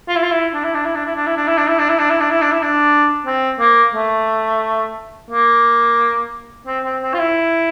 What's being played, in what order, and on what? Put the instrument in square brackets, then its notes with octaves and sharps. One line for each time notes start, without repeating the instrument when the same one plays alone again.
[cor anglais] F4
E4
F4
E4
D4
E4
D4
E4
D4
E4
D4
E4
D4
E4
D4
E4
D4
E4
D4
E4
D4
E4
D4
E4
D4
C4
A#3
A3
A#3
C4
C4
C4
F4
E4